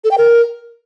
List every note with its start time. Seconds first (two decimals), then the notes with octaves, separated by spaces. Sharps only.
0.04 A4
0.11 G5
0.18 A#4